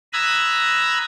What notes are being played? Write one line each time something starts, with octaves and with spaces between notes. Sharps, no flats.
A#5 B5 D#6 E6 F#6 G#6